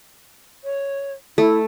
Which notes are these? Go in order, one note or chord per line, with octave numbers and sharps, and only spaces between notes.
C#5
A3 E4